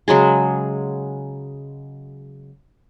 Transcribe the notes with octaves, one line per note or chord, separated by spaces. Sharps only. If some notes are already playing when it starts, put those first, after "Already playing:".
C#3 F#3 G#3 G#4